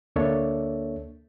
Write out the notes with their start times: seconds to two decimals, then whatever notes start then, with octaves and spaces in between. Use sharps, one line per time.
0.16 D2 A#3 D4 A4 C#5 E5